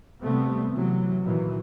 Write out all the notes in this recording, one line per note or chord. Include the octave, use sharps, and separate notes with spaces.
C3 G3 A3 B3 C4
C3 E3 F#3
A#2 D#3 E3 F#3